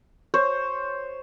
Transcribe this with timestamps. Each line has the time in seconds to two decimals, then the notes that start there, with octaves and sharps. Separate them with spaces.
0.34 C5 C#5